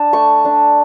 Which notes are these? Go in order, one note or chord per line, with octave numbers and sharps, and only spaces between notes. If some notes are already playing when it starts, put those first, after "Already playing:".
Already playing: D4 A5
A3 C#6
D4